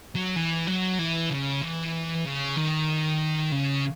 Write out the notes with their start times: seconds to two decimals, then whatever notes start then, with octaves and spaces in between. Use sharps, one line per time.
0.15 F#3
0.36 E3
0.67 F#3
0.99 E3
1.31 C#3
1.62 E3
2.25 C#3
2.57 D#3
3.52 C#3